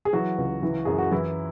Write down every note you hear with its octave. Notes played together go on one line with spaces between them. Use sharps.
G#4
E3 F#3 F#4
C#2
E3
F#2 G#4
F#4
E3 E4